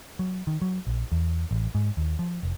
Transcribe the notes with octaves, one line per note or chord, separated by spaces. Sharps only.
F#3
D#3
F#3
A#1
E2
A1
G#2
D#2
F3
F1